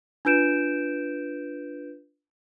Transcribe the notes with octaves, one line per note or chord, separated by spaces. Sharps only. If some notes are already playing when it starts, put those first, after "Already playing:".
D4 F4 B4 G6 D7 E7